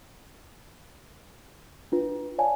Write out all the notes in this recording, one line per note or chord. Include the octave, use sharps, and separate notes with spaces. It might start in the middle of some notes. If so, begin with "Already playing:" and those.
D4 F4 B4
C#5 D5 F5 G#5 A5